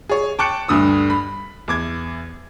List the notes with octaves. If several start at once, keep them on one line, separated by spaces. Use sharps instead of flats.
G#4 C#5
G5 A5 C#6 D6 F#6 C#7
D2 G2 D3 D#6 E6
B5
E2 D6 G#6